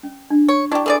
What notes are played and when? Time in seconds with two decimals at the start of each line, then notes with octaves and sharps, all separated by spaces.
0.03 C#4
0.30 D4
0.49 C#5
0.72 D4 E4 G4 D5 C#6
0.86 E3 G#4 A4 D5